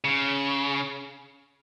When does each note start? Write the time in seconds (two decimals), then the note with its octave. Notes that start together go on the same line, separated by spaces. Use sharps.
0.04 C#3